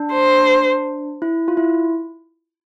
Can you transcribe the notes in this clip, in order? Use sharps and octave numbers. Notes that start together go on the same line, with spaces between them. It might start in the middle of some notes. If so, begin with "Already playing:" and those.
Already playing: D4
C5
E4
F4
E4